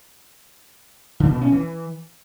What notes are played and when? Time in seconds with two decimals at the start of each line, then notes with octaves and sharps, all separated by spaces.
1.20 D3
1.31 B2
1.41 C#4
1.52 E3